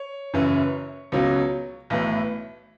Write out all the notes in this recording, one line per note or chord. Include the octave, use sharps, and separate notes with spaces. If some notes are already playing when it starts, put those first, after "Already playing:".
Already playing: C#5
F#1 F#2 E3
C#2 B2 F#3
B1 A2 E3